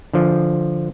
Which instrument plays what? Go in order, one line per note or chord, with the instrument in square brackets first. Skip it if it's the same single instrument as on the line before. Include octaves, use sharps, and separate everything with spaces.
[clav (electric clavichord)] D3 F3